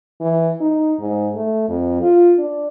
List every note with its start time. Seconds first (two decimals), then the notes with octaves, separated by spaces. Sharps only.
0.21 E3
0.61 D#4
1.00 G#2
1.35 A3
1.69 F2
2.02 F4
2.38 D4